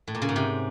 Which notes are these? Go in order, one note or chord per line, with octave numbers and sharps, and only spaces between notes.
A2
A#2
C#3
G#2
C3